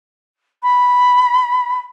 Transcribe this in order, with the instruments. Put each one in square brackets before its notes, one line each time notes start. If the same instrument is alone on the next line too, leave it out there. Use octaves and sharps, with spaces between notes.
[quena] B5